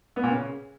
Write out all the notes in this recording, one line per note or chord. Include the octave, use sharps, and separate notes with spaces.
B3
A#2
C#3